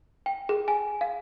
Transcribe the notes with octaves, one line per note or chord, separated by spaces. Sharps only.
G5
G#4
G#5
F5